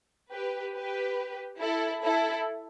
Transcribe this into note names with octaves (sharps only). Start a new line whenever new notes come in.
G4 B4
G4 B4
E4 A4
E4 A4